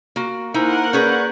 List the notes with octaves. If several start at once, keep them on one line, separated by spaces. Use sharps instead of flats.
A#3 F#4
A#3 D#4 E4 A#4 C5 F#5 G#5
C#4 G#4 B4 D5 C#6 G6